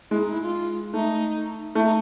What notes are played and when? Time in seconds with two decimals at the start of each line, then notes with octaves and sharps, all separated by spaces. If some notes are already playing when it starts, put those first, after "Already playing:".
0.11 G#3 E4
0.21 D#4
0.31 E4
0.42 F4
0.93 A3 D#4
1.75 A3 E4
1.83 D#4